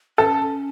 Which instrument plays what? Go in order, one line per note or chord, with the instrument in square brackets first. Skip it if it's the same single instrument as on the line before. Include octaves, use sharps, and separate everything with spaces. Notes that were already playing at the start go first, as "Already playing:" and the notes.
[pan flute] C#4 [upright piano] A4